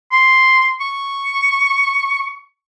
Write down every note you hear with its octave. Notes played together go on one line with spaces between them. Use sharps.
C6
C#6